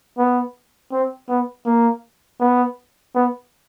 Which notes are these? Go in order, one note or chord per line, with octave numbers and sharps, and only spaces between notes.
B3
C4
B3
A#3
B3
B3